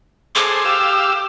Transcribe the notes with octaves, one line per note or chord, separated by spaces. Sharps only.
G#4 A4 C5 D6
G4 F5 E6